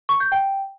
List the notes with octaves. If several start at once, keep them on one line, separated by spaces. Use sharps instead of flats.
C#6
G6
G5